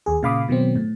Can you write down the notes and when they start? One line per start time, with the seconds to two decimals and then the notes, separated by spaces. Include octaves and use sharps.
0.06 D#2 G#4
0.23 A#2 C#3 F5 B5 D6 D#6
0.49 B2 D#3 F#3 C4
0.76 A2